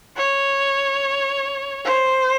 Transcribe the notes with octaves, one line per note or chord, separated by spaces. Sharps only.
C#5
C5